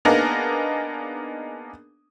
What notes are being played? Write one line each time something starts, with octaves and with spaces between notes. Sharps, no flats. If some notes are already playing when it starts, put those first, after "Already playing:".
A#3 B3 D4 D#4 G#4 A#4